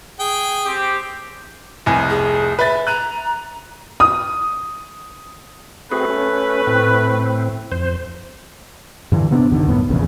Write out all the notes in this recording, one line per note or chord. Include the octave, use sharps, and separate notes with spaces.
G#4 G5
C4 G4
F1 C2 G#5
G#4
B4 E5 A6
A#5 F#6 D#7
D#6
A3 C4 F#4 G#4 B4
C#4
A2 C4
F2 C5
G2 D3 E3
C3 B3 C#4 D4
F#1 D#2 D3 D#3
C2 F#2 A2 B3
F1 A#1 E2 C#3